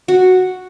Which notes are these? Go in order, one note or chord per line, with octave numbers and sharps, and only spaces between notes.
F#4